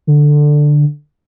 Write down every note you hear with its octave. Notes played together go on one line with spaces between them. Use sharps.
D3